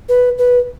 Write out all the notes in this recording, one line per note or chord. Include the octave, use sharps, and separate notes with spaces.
B4
B4